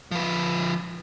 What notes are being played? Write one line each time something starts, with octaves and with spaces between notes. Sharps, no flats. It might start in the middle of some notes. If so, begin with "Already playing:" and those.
F3 B4